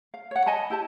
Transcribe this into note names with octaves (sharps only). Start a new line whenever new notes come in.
F5
C#5 F#5
D#5 G#5 A5 B5
E4 G4 A5